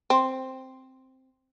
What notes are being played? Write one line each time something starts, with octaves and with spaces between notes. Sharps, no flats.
C4